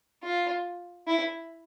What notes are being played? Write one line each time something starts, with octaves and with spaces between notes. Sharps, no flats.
F4
E4